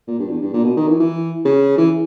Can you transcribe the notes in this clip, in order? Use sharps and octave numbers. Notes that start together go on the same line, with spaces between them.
A#2
G2
E2
G2
A#2
B2
D#3
E3
E3
C#3
E3